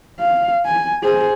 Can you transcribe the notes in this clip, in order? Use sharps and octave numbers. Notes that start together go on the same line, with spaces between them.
F5
G#5
G#4 C5